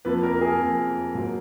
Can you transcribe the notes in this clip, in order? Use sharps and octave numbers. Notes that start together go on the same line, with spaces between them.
F2 F3 A#3 B4
A#4
A#4
G#4
F2 F3 A#3
G#2 F#3 A#3